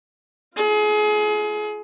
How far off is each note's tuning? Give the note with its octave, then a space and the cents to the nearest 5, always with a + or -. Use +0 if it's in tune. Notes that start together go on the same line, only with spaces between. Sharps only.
F4 -20 G#4 +30